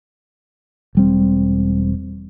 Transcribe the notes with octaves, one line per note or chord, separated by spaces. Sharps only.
E1 G3 C4